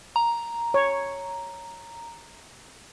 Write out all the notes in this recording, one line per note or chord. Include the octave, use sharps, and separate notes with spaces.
A#5
C#5